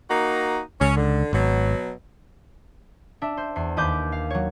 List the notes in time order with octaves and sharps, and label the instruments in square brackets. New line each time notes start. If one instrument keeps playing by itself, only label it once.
[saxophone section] A#3 D#4 F#4
[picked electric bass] C#2 [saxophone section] C#4
[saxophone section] D3
[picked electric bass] G#1 [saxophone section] B2 F#3
[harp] D4 E5
C5
E2 C7
D#2 B4 D#5 D6 G6
F5
F#3 C#5